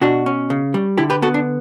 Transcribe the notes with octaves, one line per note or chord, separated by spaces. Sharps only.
B2 D4 F#4
C#4
C#3
G3
D3 E4 G4
G4 B4
B3 F#4 A4
D4